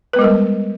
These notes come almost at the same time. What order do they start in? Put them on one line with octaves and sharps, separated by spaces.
B4 B3 G#3 A#4 G3